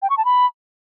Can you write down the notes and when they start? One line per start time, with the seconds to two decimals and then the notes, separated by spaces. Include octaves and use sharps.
0.02 G5
0.10 C#6
0.17 A5
0.25 B5